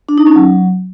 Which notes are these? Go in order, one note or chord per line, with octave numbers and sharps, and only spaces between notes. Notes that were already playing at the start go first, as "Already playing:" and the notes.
D4
D#4
C#4
F#3